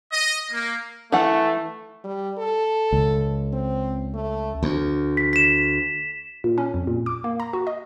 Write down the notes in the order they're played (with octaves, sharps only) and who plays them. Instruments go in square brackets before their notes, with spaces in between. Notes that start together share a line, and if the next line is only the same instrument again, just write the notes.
[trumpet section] D#5
A#3
[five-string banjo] E3 F#5 [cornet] A3
[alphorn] G3
A4
[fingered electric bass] C#2
[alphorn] C4
A3
[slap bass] D2
[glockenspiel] B6
B6 E7
[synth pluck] A#2
C#4
F2
A#2
D6
A#3
A#5
F#4
D#5